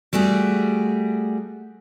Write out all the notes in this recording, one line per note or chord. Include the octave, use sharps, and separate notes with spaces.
G3 A3 F#4 G#4